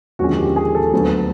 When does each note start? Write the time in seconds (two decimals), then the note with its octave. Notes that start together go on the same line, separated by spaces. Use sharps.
0.19 D#2 D3 F3 G#3 C#4 F#4
0.38 G4
0.56 G#4
0.75 A4
0.93 D2 D3 F#3 B3